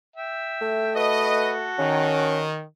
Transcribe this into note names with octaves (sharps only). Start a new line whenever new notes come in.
E5 G5
A3
F#4 A4 B4 D#5
D#3 C#4